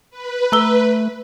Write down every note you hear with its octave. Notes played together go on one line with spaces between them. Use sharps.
B4
A3 A#5 E6 G7